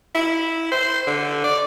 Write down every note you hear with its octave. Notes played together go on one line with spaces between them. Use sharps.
E4
C5
D3
D5